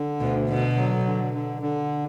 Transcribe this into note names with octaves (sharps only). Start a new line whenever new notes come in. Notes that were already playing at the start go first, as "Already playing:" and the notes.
Already playing: D3
D2 B2
B2 D3
F#3
D3
D3
D3